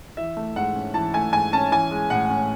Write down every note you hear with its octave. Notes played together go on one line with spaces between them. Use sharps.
E3 E5
A3
G#2 F#5
C#4
E3 A5
A3 G#5
G#2 G#5
C#4 A5
E3 G#5
G#3
A2 F#5
C#4